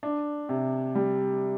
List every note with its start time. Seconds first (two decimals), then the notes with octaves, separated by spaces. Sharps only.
0.03 D4
0.49 C3
0.95 G3